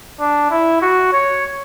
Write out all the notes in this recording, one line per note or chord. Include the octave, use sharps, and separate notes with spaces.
D4
E4
F#4
C#5